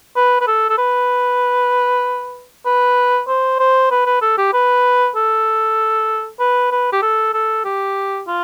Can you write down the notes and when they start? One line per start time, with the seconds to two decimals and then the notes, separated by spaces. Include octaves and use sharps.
0.16 B4
0.41 B4
0.47 A4
0.70 A4
0.78 B4
2.65 B4
3.28 C5
3.59 C5
3.91 B4
4.06 B4
4.22 A4
4.38 G4
4.53 B4
5.16 A4
6.40 B4
6.72 B4
6.92 G4
7.02 A4
7.34 A4
7.65 G4
8.28 F4